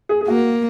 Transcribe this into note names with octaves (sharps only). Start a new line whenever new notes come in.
G#4
G#4
A#3 F#4